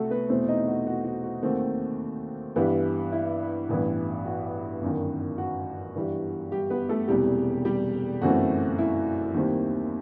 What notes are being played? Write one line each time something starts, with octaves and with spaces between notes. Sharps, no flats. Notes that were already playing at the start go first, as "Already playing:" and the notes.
Already playing: C2 C3 A3 F#4 A4
B3 B4
E2 B2 A3 C4 C5
D#4 D#5
F#4
F#4
F#4
F#4
D#2 D#3 A3 C4 F#4
G2 E3 G3 B3
E4
A1 G2 E3 B3
F#4
G1 F#2 D#3
F#4
G2 E3 G3
G3 G4
B3 B4
A3 A4
E1 E2 C3 G3 G4
G3 G4
G1 F#2 E3 A3 C4 F#4
E4
D#2 D#3 G3 C4